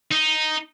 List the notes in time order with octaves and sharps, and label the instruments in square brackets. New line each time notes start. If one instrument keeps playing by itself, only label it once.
[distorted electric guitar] D#4